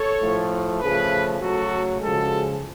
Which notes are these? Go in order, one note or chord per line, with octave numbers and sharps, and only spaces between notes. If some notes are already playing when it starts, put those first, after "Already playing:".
Already playing: A4 C#5
A2 F3 A3
C#3 F3 A3 G#4 B4
C#3 F#3 A3 F#4 A4
C#3 F3 G#3 F#4 A4